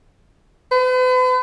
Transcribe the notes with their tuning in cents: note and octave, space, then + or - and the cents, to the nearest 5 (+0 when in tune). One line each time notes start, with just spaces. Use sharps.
B4 +45